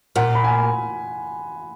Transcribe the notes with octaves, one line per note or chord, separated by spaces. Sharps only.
A#2 F#5
B5
G#5